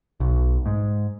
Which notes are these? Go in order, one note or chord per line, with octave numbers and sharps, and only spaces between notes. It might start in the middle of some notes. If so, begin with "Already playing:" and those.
B1
G#2